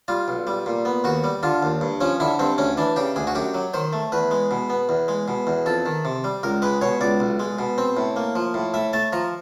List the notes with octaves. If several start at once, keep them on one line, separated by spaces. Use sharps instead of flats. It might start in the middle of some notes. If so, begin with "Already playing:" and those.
G3 F4
B1
G3
A#2
B3
D#2 F#4
G3
D3 F4
D#2
G2
F3 C#4
D3 E4
G2 C4
D2 C#4
E3 D4
C#3 G4
D2 G#4
F#4
F#2 G4
F#3
D#3 C5
A3
E2 B4
G#3
B2
B3
E2
G#3
B2
E2
F2 A4
D#3
C3
G3
C#2 A#4
G#3 B4
B2 C#5
C#2 D5
B1
G#3
B2
C4
A2
A#3
F3
A2
A2 E5
A3 A5
F3 A#5